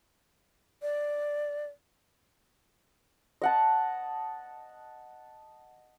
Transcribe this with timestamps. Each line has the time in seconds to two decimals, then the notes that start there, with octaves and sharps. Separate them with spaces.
0.82 D5
3.42 D#5 F#5 A5